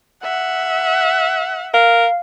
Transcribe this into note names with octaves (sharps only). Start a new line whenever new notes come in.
E5 F#5
A#4 F5